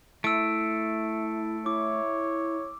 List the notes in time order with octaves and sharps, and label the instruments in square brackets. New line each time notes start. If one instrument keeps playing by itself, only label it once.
[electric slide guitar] A3 [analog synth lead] E4 [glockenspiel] E6 D7
[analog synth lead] E4 [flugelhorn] C#5 [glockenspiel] D6